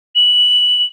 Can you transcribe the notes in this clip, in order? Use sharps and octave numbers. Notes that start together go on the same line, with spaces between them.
F#7